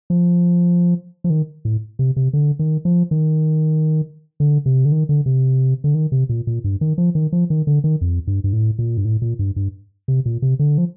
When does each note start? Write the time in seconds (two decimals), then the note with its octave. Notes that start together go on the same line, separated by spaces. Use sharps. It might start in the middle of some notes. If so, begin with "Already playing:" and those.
0.10 F3
1.24 F3
1.30 D#3
1.65 A2
1.99 C3
2.16 C3
2.33 D3
2.59 D#3
2.85 F3
3.11 D#3
4.40 D3
4.66 C3
4.85 D3
4.92 D#3
5.09 D3
5.26 C3
5.84 D3
5.95 D#3
6.12 C3
6.29 A#2
6.47 A#2
6.64 G2
6.81 D#3
6.98 F3
7.15 D#3
7.32 F3
7.50 D#3
7.67 D3
7.84 D#3
8.01 F2
8.27 G2
8.44 G2
8.53 A2
8.79 A#2
8.97 G2
9.05 A2
9.22 A#2
9.39 G2
9.56 G2
10.08 C3
10.26 A#2
10.42 C3
10.59 D3
10.78 F3